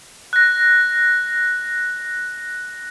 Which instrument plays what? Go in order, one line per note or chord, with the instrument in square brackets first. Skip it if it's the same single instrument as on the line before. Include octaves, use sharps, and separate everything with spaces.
[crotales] F#6 A#6